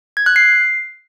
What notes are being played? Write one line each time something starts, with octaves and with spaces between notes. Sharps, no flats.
G#6
F#6
C7